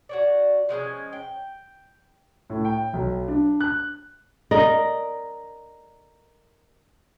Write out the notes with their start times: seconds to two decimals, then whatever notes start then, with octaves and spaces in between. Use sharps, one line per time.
0.09 F#4 C#5 D5
0.69 F3 G#3 C4 C#4
1.13 G5
2.50 A2
2.65 G5
2.93 B1
3.28 D4
3.60 F#6
4.51 A#4 D5 D#5